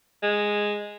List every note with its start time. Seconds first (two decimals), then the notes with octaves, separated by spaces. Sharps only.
0.23 G#3